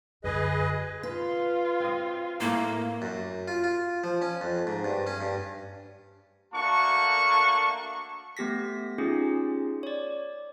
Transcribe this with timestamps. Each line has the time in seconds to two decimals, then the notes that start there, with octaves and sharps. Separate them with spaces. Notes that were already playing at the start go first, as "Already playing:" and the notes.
0.24 F#2 D3 G#4 B4 D#5
1.03 F4 B4
1.80 C4 D#5
2.40 A2 A3 A#3 A#4
3.02 F#2
3.48 F4
3.64 F4
4.04 F3
4.22 C#4
4.41 F2
4.67 G#2
4.85 G2
5.07 C#4
5.21 G2
6.54 A3 A#3 D4 F#4 A5 C#6
8.37 A3 B3 G4 A#6 B6
8.98 C#4 D#4 F4 G4 G#4
9.83 C#5 D5